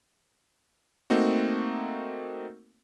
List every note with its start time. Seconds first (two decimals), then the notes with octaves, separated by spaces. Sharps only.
1.10 A3 A#3 C4 D#4 F#4